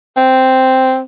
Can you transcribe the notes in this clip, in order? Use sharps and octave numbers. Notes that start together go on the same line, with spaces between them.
C4